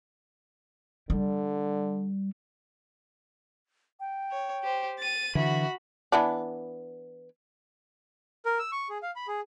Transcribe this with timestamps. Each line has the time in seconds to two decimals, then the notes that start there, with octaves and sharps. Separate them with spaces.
1.10 D3 G3
4.00 G5
4.31 C#5
4.63 G4 C5
4.99 A6 D#7
5.35 D3 E3 F#4 E5 B5
6.12 E3 B3 D4
8.46 A#4
8.59 E6
8.72 C#6
8.89 G#4
9.03 F5
9.16 B5
9.28 G#4